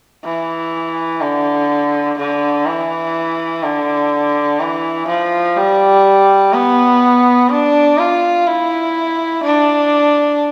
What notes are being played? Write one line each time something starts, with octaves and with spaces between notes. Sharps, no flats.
E3
D3
D3
E3
D3
E3
F3
G3
B3
D4
F4
E4
D4